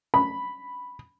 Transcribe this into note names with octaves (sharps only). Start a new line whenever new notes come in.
B5